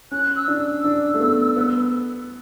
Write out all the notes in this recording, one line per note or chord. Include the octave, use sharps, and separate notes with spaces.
C#4 F#6
E6
D4
E6
D4
A3
B3
B3